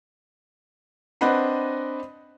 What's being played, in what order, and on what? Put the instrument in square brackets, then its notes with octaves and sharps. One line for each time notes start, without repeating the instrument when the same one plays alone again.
[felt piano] C4 D4 B4 D#5 F#5 B5